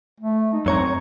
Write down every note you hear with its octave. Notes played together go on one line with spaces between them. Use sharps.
A3
D#4
F#2 C4 C#5 A#5